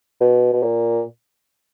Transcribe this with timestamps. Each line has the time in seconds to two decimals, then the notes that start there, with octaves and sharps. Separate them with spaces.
0.21 B2
0.53 B2
0.63 A#2